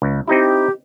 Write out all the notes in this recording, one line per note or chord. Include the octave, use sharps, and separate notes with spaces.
C#2
C4 D#4 E4 G4